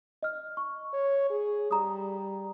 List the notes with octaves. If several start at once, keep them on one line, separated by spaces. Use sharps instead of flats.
D#5 F6
C#6
C#5
G#4
G3 A#5 D#6